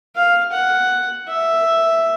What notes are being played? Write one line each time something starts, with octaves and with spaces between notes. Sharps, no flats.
F5
F#5
E5